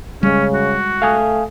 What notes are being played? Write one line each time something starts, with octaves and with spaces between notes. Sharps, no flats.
C#3 G3 G#3 C#4
F#4
A3 F5 G#5 D#6